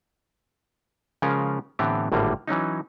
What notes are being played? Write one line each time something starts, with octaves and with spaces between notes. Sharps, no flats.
C#3 F3 G#3 C#4 F4 A#4
A2 D3 E3 B3 C4 G4
G#1 A2 D3 G3 A#3
E3 F#3 C#4 D#4